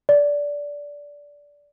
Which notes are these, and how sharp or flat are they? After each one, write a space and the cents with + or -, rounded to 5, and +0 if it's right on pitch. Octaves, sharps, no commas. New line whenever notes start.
D5 -15